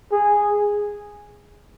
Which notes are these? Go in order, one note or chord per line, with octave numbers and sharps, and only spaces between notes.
G#4